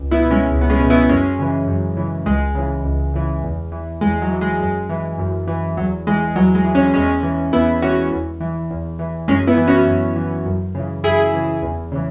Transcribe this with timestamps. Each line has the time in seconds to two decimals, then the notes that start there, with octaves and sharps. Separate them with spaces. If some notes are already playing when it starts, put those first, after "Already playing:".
Already playing: C#2
0.11 B3 E4
0.22 B2
0.31 G#3 C#4
0.51 C#2
0.61 B3
0.70 G#3 C#4
0.80 B2
0.90 B3 E4
1.09 F#2 G#3 C#4
1.39 C#3 E3
1.67 F#2
1.97 C#3 E3
2.26 C#2 G#3
2.55 C#3 E3
2.84 C#2
3.14 C#3 E3
3.44 E2
3.72 E3
4.01 E2 G#3
4.22 F#3
4.31 E3
4.41 G#3
4.60 F#2 G#3
4.89 E3
5.18 F#2
5.48 E3
5.77 E2 F#3
6.07 E3 G#3
6.36 E2 F#3
6.55 G#3
6.64 E3
6.75 G#3 C#4
6.94 E2 G#3 C#4
7.23 E3
7.52 E2 B3 E4
7.82 E3 C#4 F#4
8.12 E2
8.40 E3
8.70 E2
8.99 E3
9.28 F#2 G#3 C#4
9.47 B3 E4
9.57 E3
9.67 C#4 F#4
9.87 F#2
10.16 E3
10.46 F#2
10.75 C#3 E3
11.04 F#2 E4 G#4
11.33 C#3 E3
11.62 E2
11.92 C#3 E3